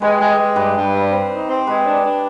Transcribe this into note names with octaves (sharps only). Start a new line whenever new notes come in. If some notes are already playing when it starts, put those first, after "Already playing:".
G#3 G4 B4
G#3
G#3
G2 G4 B4
G2
G3
C4
D#4
C4
G#3 G4 B4
D4
D4